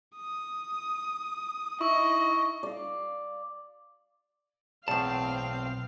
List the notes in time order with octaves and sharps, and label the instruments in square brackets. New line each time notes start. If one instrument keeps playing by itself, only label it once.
[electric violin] D#6
[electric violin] D#4 D#5 [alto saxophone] E4 [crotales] C#6
[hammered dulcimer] D5 F5
[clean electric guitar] B1 A5 [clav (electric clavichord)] E2 A2 [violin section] C4 [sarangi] F5